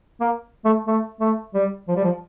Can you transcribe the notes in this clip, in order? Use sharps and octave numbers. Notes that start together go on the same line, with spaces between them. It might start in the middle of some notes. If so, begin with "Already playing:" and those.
A#3
A3
A3
A3
G3
F3
G3
F3